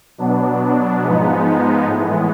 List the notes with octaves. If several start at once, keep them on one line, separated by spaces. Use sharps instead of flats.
B2 F#3 B3 D4
G#2 F3 G#3 B3 D#4
A2 E3 G#3 B3